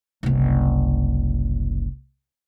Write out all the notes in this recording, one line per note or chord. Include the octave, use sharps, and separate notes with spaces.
F#1 C2